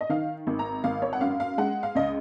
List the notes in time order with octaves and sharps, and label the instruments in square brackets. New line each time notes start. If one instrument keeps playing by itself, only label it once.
[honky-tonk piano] D#5
D#3 F5
G#1
A#5
G#1 F5
C#5
F#5
F#2 F5
F5
G#3 F#5
F5
C#2 D#5